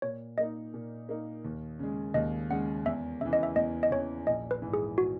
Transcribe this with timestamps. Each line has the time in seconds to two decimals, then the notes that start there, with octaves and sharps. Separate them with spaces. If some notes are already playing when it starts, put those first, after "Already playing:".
0.02 A#2 C#5
0.38 A#3 D#4 D#5
0.74 A#2
1.09 A#3 D#4
1.45 D#2
1.79 C#3 G#3
2.14 D#2 D#5
2.50 C#3 G#3 F#5
2.86 E2 E5
3.21 C#3 E3 E5
3.33 D#5
3.43 E5
3.56 E2 D#5
3.83 D#5
3.91 C#3 E3 C#5
4.27 A#1 D#5
4.51 B4
4.62 G#2 E3
4.74 G#4
4.98 F#4